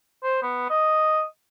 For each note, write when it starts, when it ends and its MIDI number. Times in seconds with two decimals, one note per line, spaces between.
0.24 0.38 72
0.43 0.66 59
0.70 1.24 75